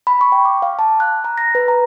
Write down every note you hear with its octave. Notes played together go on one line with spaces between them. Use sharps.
B5
C#6
G5
D6
F5
A5
F#6
A#5
A#6
B4
A#5